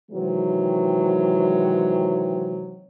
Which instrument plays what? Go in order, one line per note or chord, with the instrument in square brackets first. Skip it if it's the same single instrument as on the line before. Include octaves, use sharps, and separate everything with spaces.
[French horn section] C3 D#3 E3 F#3 G#3 C4